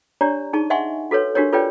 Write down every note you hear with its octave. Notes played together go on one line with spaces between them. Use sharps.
D4 G4 C#5 D5 A#5
D#4 G#4 A5 C#6
D#5 E5 F#5 G#5 C6 C#6
F#4 A4 B4 C#5
D4 F#4 G4 A#4 C#5
F4 A4 B4 C#5 D5 G5